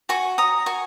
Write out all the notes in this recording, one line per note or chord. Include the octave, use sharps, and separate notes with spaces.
F#4 G#5 C#6
C#5 A#5 D#6
F#4 G#5 C#6